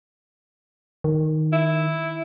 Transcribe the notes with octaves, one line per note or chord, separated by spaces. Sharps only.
D#3
E4